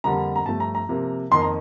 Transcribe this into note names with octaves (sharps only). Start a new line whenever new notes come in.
F2 D3 G3 A#3 A#5
A#5
G2 F3 A3 A5
A#5
A#5
C3 F3 A#3
F2 D#3 A#3 C6
A#5